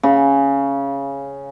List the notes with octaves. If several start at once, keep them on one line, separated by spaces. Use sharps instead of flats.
C#3